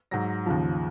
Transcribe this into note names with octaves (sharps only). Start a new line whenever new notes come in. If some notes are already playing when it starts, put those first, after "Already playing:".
G#2 F#3 A#6
D#2 C#3 F3